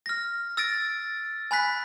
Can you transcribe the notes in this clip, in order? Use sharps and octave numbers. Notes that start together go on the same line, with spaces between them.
F6 A#6
E6 A6 A#6 D7
G#5 B5 F#6 B6